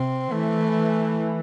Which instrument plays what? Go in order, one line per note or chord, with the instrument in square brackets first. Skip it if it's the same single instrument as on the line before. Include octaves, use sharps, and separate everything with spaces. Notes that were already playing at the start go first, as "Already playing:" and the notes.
Already playing: [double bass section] C3 [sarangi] C4
[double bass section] E3 [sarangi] A3